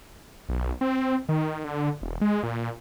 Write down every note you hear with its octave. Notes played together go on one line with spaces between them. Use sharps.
B1
C4
D#3
D3
E1
G#3
A#2